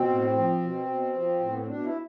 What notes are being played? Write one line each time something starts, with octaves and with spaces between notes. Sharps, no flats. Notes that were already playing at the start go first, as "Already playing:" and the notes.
Already playing: B2 C4
A2
F3
B2
B2
F3
A2
B3
C4
B2 D4
E4